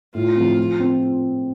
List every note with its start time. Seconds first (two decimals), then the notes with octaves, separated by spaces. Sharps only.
0.15 A2 F4
0.36 F3 C4
0.58 F3
0.80 C4